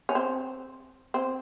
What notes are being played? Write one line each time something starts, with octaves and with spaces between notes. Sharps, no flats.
C#4
C4
C4